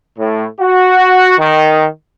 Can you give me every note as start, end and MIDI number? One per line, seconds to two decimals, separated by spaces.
0.19 0.46 45
0.60 1.33 66
1.38 1.87 51